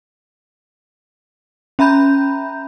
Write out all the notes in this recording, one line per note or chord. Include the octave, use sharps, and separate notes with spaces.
C#4 E5 A#5 B5 G6